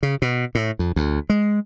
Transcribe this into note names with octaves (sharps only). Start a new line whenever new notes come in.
C#3
B2
A2
F2
D2
G#3